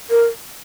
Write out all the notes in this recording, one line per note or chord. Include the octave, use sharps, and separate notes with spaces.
A#4